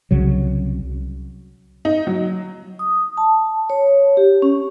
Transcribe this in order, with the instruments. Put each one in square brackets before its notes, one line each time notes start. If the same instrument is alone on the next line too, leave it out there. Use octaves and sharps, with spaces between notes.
[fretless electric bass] C2 C#3 F#3
[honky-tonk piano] D#4
F#3
[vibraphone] D#6
A5
C#5
G4
C#4